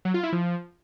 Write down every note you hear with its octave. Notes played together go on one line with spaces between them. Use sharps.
F#3
F4
E4
F3